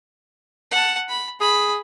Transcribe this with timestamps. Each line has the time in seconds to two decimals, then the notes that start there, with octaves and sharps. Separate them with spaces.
0.71 F#5 A5
1.09 B5
1.41 G#4 B5